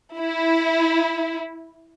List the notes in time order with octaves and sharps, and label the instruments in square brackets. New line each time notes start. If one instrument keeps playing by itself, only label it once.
[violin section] E4